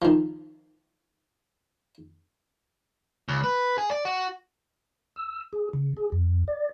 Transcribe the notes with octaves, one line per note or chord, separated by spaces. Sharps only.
D#3 F3
C#2
B4
G#4
D5
F#4
E6
G#4
C#3
G#4
F2
D5